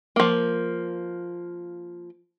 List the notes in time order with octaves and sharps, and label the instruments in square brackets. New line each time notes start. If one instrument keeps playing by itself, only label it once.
[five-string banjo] F3 A#3